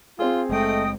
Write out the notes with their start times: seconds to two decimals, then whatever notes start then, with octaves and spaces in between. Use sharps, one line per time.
0.19 C4 F4 G#4
0.50 F#1 G#3 A3 D#5 G5 D#6